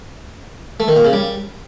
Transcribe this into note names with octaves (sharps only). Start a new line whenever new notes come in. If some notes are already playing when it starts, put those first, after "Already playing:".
A3
D#3
A#2
C#3
G3